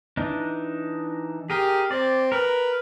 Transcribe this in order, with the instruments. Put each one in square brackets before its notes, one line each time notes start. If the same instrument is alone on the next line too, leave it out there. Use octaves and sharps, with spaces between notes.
[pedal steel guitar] E3 D4 D#4
[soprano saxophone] G4 [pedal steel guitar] G#4 A#4
[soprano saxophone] C4 [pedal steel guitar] D5
[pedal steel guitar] A#4 [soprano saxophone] B4